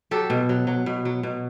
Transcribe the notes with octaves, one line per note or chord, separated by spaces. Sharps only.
F#3 G4 A4
B2
F#3
F#3
B2
F#3
B2